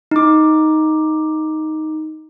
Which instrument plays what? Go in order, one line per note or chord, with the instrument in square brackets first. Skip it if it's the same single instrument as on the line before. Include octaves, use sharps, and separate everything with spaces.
[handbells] D#4 D6